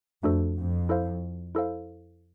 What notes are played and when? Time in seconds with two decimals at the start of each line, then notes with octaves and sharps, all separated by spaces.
0.23 F2 A3 D4 F#4 A4 C5
0.57 F2
0.89 E4 A4 C5 F5
1.55 E4 A4 C5 F5